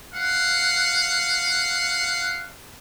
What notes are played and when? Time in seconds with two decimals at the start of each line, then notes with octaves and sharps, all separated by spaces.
0.14 F5 F#5